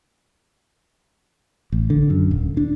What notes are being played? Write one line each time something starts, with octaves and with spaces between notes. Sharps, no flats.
A1
D3
F#2
D#1
D4